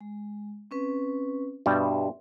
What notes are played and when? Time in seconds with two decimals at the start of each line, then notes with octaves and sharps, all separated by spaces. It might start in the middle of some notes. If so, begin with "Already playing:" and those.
0.01 G#3
0.71 C4 C#4 B4
1.66 G2 B2 G3 E5 C6